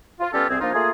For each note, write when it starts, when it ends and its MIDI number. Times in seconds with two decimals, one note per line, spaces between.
0.20 0.29 65
0.33 0.45 55
0.33 0.45 59
0.33 0.45 61
0.33 0.45 65
0.33 0.45 67
0.33 0.45 69
0.49 0.56 36
0.49 0.56 60
0.49 0.56 68
0.61 0.70 53
0.61 0.70 58
0.61 0.70 62
0.61 0.70 63
0.61 0.70 65
0.73 0.90 57
0.73 0.90 58
0.73 0.90 65
0.73 0.90 68